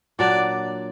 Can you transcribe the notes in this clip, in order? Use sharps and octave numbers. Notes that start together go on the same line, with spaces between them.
A#2 F#3 D4 D5